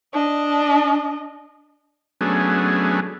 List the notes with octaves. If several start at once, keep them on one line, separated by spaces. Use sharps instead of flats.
D4 D#5
F#3 A3 B3 C#4 D4 G#4